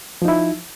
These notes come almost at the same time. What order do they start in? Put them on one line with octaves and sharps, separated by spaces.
F3 D#4 E4